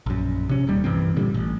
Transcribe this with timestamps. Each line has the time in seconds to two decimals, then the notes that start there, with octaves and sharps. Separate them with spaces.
0.06 A#1 F#2
0.49 C3 C#4
0.67 D#1 D#2 G3
0.84 C2 G2 E3 C4
1.16 A#2 D3 G3
1.34 A1